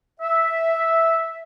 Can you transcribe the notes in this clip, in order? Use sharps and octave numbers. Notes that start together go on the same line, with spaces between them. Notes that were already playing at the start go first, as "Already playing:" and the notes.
E5